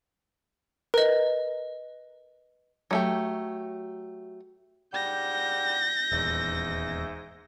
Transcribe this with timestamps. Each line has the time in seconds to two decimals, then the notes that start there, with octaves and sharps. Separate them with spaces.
0.94 A#4 B4 D#5
2.91 F#3 A3 G4
4.94 G#2 G3 F#5 G6 A#6
6.12 D#1 E2 G#2 E5